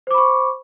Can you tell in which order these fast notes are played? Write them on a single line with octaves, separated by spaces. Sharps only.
C5 D6 B5 C#6